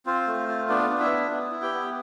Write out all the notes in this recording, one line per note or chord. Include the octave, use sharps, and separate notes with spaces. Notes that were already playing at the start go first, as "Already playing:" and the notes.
C4 F4 C5
A3
F4
B3 D4 D5
D4
E4 E5
B3
B3
E4
G4 G5
B3